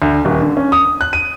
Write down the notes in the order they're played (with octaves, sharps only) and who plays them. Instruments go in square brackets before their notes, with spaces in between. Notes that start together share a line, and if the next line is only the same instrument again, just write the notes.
[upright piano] D2
D#1
D3
C#4
D#6
F#6
D#7